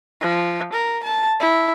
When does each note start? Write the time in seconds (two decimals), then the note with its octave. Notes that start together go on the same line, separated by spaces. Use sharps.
0.21 F3
0.73 A#4
1.03 A5
1.40 E4